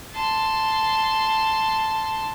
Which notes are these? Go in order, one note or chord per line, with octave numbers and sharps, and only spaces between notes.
A5 C6